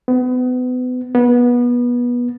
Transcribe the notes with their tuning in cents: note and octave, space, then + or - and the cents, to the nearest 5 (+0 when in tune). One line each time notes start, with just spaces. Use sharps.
B3 +30
B3 -25